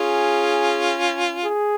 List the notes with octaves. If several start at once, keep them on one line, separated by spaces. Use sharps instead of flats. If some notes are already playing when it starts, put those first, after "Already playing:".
Already playing: C#4 F4 G#4
G#4